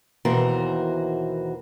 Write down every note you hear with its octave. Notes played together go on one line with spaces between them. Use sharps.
D#2 B2 E3 F#4 A#4 C5